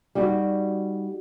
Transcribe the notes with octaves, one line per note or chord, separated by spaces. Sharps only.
G3 D#4 F#4